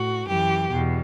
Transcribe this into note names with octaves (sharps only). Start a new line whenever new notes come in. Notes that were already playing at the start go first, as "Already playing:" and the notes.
Already playing: A2 F#4
F#2 E3 G4
E2 B2